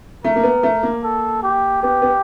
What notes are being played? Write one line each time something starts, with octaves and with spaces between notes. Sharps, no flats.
A3 A#4
A#3
B3
A3
A#3
A4
G4
B3 G4
B3